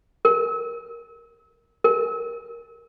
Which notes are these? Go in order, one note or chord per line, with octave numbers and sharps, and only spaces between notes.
A#4
A#4